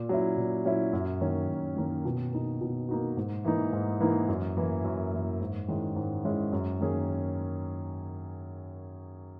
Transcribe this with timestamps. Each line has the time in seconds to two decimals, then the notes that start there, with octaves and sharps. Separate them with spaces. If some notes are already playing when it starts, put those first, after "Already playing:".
Already playing: A#2
0.09 F#3 C#4 E4
0.37 A#2
0.65 F#3 C#4 E4
0.93 F#2
1.21 D#3 A#3 C#4
1.49 F#2
1.77 D#3 A#3 C#4
2.05 B2
2.32 A#3 D#4 F#4
2.61 B2
2.89 A#3 D#4 F#4
3.17 G#2
3.45 E3 A#3 D#4
3.73 G#2
4.00 E3 A#3 D#4
4.28 F#2
4.57 E3 A#3 E4
4.84 F#2
5.12 E3 A#3 E4
5.41 G#2
5.68 D#3 G#3 C#4 E4
5.96 G#2
6.25 D#3 G#3 C#4 E4
6.52 F#2
6.81 D#3 A#3 C#4 G#4